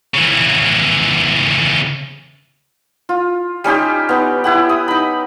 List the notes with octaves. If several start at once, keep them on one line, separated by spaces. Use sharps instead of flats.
C#3 E3
F4
G3 C#4 D#4 G4
B3 D#4
E4 G4 F#5
D#6
D#4 B5